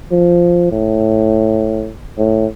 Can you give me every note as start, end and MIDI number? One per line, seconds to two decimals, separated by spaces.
0.11 0.68 53
0.72 1.90 45
2.18 2.46 45